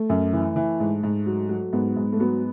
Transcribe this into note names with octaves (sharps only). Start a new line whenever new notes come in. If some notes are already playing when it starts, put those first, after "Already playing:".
Already playing: A3
F#2
E3
E3
G#2
G#2
F#3
F#3
G#2 B3
G#2
A3
F#3 B3